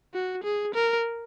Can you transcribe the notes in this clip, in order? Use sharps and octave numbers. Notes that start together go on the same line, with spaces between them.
F#4
G#4
A#4